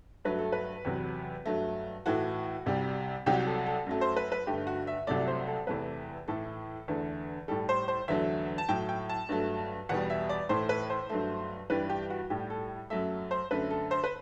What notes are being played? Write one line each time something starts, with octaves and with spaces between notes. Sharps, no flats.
G2 F#3 A3 B4
A4
B4
E2 C3 F#3
G2 F#3 A3
A2 E3 A3 F#4
C2 C3 G3
C2 C3 F#3 G4
A4
A4
F#2 F#3 A3
C5
B4
B4
G2 D3 A3 G4
F#4
E5
C2 C3 F#3 A3 D5
C5
A4
E2 C3 E3 A3 B4
A2 E3 A3 A4
E2 D3 A3
A2 G3 A4
C5
C5
E2 D3 F#3 A3 E5
A5
A2 F#3 A3 G5
G5
A5
G2 F#3 A3
E2 B2 G3 F#5
E5
D5
A2 E3 A3 C5
B4
C5
G2 F#3 A3
G2 E3 G3 B4
G4
F#4
A2 G3 G4
A4
F#2 F#3 A3 E5
C5
F#2 D3 A3 B4
A4
C5
B4